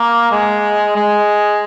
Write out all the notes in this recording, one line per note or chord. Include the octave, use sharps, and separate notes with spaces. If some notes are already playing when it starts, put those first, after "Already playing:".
Already playing: A#3
G#3
G#3